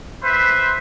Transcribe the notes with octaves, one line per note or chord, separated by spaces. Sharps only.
B4 C5 E5